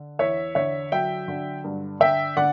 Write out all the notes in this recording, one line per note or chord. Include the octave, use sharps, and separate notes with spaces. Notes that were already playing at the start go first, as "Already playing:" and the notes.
Already playing: D3
E2 C#5 E5
D3 C#5 E5
F#3 E5 G5
D3
G2
D3 E5 G5
D3 D5 F#5